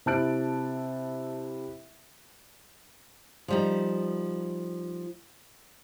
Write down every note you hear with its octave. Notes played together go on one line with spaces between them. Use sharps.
C3 E4 A5 F#6 D7
F3 G3 D#4